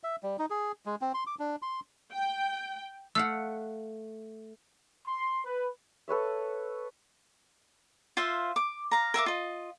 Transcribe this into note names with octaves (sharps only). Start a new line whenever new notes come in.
E5
G3
D#4
G#4
G#3
C4
C6
D6
D4
C6
G5
A3 F5 F#5 E6
C6
B4
A4 B4 C#5 E5
F4 C5 E5 F5
D6
F5 A#5
A#4 E5 F5 D6
F4 D#5